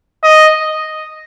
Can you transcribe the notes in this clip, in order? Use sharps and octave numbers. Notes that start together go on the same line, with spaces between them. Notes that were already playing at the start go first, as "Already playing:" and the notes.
D#5